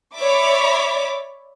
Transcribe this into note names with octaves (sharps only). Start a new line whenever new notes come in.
C#5 D5 E5 B5 D6